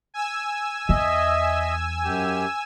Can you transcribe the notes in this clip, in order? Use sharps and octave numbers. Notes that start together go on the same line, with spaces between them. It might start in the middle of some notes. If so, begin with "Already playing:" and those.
G#5 E6
E2 D#5 E5
F#2 G4